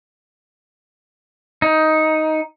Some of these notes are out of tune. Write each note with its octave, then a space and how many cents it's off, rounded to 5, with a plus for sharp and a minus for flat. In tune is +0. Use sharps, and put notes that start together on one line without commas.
D#4 +10